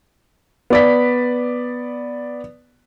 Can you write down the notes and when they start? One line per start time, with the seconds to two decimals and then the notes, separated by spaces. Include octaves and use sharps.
0.70 B3 D5 B6